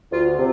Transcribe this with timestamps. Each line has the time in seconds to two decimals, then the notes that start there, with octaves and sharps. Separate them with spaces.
0.12 D2 F4
0.37 C3